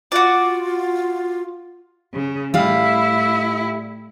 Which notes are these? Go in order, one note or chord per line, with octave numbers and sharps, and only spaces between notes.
F4 F#4 D5
C#3
A2 G3 E4 E5 F5